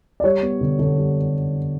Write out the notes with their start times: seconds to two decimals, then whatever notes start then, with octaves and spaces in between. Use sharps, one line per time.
0.20 D5
0.24 G3 C#5
0.42 B3
0.61 D3
0.79 D3
0.98 G3